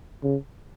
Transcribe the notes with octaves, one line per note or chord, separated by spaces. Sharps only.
C#3